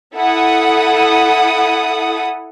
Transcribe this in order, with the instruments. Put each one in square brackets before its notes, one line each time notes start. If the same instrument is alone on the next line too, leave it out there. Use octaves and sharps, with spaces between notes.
[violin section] E4 A4 F#5 D#6